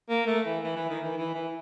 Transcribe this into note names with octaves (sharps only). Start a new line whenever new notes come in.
A#3
A3
E3
E3
E3
D#3
E3
E3
E3